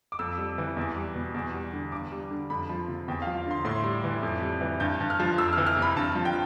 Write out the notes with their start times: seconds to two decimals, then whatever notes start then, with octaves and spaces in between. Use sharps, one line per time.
0.12 D6
0.19 F2 E6
0.38 G3
0.58 E3
0.77 E2
0.96 G3
1.15 B2
1.34 E2
1.54 G3
1.73 D3
1.92 G2 D6
2.12 G3
2.31 D3
2.50 F2 B5
2.69 F3
2.88 C3
3.08 E2 G5
3.22 F3 F5
3.37 F5
3.46 D3 C6
3.65 A2 C6
3.84 G3
4.04 E3
4.23 F2
4.42 G3
4.61 E3
4.80 G2 G6
5.00 G2
5.10 F6
5.20 F3
5.38 F2 E6
5.53 E3 F6
5.67 F6
5.77 C3
5.82 B5
5.97 G2 A5
6.15 F3
6.25 G5